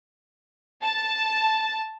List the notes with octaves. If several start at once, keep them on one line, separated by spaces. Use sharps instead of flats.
A5